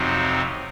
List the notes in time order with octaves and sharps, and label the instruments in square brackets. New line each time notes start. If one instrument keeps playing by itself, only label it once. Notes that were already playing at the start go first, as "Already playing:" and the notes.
Already playing: [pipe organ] F2 C3 F#3 C4 D#4